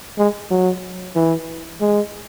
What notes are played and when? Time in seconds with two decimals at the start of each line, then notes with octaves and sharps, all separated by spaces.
0.18 G#3
0.51 F#3
1.15 E3
1.81 G#3